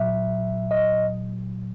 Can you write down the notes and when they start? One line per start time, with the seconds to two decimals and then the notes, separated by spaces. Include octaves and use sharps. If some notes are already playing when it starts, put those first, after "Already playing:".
Already playing: A#2 F#3 E5
0.71 D#5